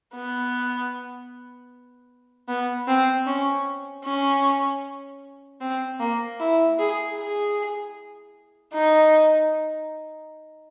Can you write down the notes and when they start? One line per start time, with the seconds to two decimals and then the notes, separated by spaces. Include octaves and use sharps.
0.14 B3
2.48 B3
2.88 C4
3.26 C#4
4.05 C#4
5.61 C4
6.00 A#3
6.40 E4
6.79 G#4
7.17 G#4
8.74 D#4